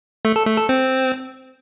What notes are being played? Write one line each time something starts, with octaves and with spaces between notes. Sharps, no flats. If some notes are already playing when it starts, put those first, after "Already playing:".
A3
A4
A3
A4
C4